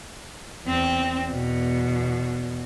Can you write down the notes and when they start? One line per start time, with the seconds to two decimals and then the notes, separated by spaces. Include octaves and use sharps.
0.64 E2 C4
1.31 E2 B2